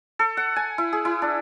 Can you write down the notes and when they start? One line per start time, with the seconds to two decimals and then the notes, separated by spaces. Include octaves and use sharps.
0.19 A4
0.37 F#5
0.56 G#5
0.78 E4
0.93 G#4
1.05 E4
1.22 D4